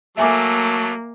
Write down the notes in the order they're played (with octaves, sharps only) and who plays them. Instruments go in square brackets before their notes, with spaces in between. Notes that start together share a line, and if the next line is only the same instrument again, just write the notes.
[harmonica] F#3 A3 A4 [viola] A#3 [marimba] E5 G#5 D6